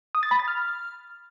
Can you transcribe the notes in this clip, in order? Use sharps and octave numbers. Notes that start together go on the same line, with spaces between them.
D#6
A6
B5
A6
F6